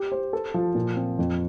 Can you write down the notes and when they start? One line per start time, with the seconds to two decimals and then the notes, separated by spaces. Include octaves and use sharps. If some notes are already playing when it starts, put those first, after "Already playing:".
Already playing: G4
0.12 C5
0.33 A4
0.54 F3
0.75 A#2
0.96 C4
1.19 F2